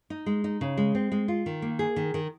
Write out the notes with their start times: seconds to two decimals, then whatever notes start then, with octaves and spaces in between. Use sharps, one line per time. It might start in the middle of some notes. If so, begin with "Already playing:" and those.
0.10 D#4
0.26 G#3
0.44 D#4
0.61 C#3
0.77 G#3
0.95 C4
1.12 G#3
1.28 F4
1.46 D#3
1.62 A#3
1.79 G#4
1.96 D#3
2.14 D#3